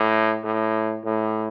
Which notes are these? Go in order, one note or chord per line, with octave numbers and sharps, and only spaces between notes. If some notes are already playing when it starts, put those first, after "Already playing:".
Already playing: A2
A2
A2